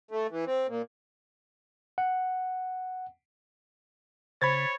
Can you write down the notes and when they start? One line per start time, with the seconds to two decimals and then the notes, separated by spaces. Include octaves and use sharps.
0.11 A3
0.31 E3
0.46 C4
0.68 A#2
1.98 F#5
4.42 C#3 C5 C#5 B5 G#6 A6